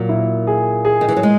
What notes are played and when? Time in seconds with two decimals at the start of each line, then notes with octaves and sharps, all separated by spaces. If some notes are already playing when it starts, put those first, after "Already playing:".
Already playing: A#2 F#3 A#3
0.09 E4
0.47 G#4
0.85 G#4
1.01 D#3
1.09 E3
1.17 F#3
1.23 G#3